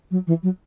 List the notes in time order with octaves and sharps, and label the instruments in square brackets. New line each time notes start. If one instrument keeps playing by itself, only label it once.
[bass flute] F#3
E3
F#3